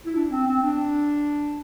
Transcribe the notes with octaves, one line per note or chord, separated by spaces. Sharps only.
E4
D4
C4
C4
D4